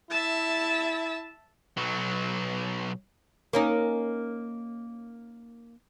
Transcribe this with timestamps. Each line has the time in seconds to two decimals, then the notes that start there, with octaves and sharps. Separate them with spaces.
0.10 E4 E5 A5
1.77 B1 F#3
3.53 A#3 C#4 D#4